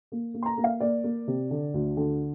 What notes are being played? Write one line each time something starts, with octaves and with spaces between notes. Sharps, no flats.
A#3
A#3
C6
A#5
A#3
F5
A#3 D5
A#3
C3
D3
D2
D3